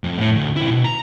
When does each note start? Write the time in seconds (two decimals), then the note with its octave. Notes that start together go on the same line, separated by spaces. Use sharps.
0.04 F2
0.18 A2
0.36 D2
0.56 B1 E4
0.70 B2
0.84 A#5